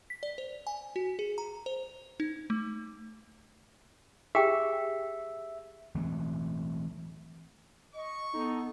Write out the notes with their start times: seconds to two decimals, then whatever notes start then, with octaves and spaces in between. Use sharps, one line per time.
0.10 B6
0.23 D5
0.38 C5
0.67 G#5
0.96 F#4
1.19 G#4
1.38 A#5
1.66 C5
2.20 D#4
2.50 A3
4.35 G4 G#4 E5 G5
5.95 E3 F#3 A3 C4
7.95 D#5 C#6
8.34 B3 D#4 A4